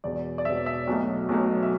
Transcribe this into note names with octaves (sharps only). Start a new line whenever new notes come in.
E1 E2 B2 D5
D5
E1 E2 B2 E5
E5
B1 B2 F#3 A3
B1 B2 F#3 A3
E5